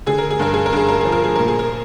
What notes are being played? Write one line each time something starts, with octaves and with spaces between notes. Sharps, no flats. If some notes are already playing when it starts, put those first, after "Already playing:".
D3 G#4
A#4
G#4
G2 A#4
G#4
A#4
G2 G#4
A#4
F3 G#4
A#4
G#4
A#2 A#4
G#4
A#4